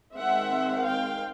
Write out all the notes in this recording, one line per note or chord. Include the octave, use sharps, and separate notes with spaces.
D#3 G#3 C4 E5 F#5
F5 G5